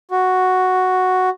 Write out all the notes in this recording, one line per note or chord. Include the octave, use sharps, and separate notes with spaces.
F#4